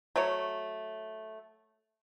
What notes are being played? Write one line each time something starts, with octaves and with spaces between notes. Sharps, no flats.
F#3 A3 C#5